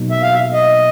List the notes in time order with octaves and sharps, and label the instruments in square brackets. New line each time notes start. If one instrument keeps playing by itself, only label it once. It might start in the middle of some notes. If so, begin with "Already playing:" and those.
Already playing: [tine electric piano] B2 F#3 A#3 D#4
[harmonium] E5
F5
E5
D#5